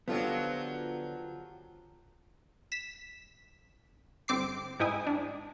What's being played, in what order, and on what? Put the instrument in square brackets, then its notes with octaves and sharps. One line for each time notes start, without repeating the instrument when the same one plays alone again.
[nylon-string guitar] D3 D#5 [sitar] F3 F#3 [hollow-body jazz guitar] B3 F4 G4
[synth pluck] B6 E7
G1 C4 D6 C7
G#2 D#4 E4 G5 G#5 D#6
D4